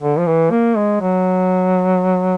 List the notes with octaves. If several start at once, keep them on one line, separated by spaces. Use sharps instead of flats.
D3
F3
E3
A#3
G#3
F#3